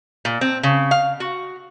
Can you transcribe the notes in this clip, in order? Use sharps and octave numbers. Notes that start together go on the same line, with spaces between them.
A#2
C4
C#3
F5
F#4